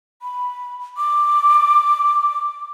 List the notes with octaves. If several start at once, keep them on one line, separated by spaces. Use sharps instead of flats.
B5
D6